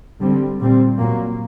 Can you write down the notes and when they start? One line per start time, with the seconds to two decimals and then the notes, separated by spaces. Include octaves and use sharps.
0.20 D3 G3 C4
0.60 A#2 G3 C4
0.99 A#2 F#3 A#3